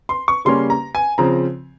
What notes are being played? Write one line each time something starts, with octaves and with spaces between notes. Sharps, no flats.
C6
C#6
C#3 G3 A#3 C#4 C6
A#5
G#5
C#3 F3 C4 A#5